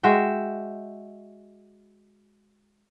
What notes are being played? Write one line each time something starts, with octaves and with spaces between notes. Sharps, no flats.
G#3 F#4 E5 G5